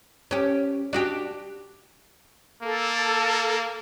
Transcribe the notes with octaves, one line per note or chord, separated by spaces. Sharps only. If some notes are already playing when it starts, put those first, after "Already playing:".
C#4 G4
D4 F#4 G4
A#3 A4